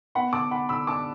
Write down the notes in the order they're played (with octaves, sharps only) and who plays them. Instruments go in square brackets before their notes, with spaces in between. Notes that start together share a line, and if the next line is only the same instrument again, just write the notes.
[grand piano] B3 F#5 B5
D3 A5 D6
D3 F#5 B5
D3 B5 E6
D4 A5 D6